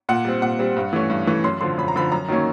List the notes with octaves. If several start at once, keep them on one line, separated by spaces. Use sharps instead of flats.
A#2 F#5
G3 C4
A#2 F#5
G3 C4
G2
E3 A3 C#4
G2
E3 A3 C#4
F#2 C6
D3 F3 C6
F#2 B5
A#5
D3 F3 B5
F#2 A#5
D#3 F#3 A#3 C#4